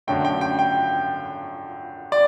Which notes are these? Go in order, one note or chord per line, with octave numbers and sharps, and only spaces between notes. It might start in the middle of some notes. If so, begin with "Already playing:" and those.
F#2 D3 F#3 A3 G5
G5
G5
G5
D5